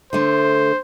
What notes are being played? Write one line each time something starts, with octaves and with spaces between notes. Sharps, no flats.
D3 A3 C5